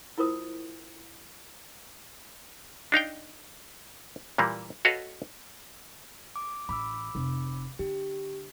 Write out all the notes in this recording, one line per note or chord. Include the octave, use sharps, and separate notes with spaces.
E4 F4 A#4 C5 D#6
D4 D#4 F5 G5
A#2 E3 G3 A#3
F#4 A4 B4 C#5 D#5 F5
D6
A1 B5 D6 E6
F1
D3 G4